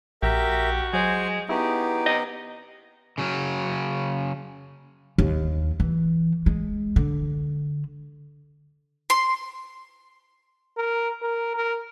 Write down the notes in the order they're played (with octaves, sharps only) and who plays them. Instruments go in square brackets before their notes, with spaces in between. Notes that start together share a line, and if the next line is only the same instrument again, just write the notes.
[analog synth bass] A#1 [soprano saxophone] F#4 [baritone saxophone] G4 [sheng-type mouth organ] A#4 E5
[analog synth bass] F#3 [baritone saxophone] G#3 [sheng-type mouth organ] C5 G#5
[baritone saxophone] C#3 [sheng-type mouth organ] B3 D#4 G4 [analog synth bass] E4
[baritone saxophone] C3 [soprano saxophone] D#5
[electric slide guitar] C#3 F#3 C#4
[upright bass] D#2
E3
G#3
D3
[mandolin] C6
[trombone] A#4
A#4
A#4